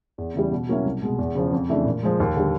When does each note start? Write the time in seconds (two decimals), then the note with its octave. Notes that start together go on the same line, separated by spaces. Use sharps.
0.18 E2
0.34 C#3 E3 G3
0.51 B2
0.69 F#3 A#3 C#4 E4
0.85 C2
1.02 B2 G#3
1.19 E2
1.35 C#3 F3
1.52 F2
1.70 C#3 E3 A3 D4
1.85 A#2
2.03 F3 G#3
2.20 D#2
2.36 D3 G3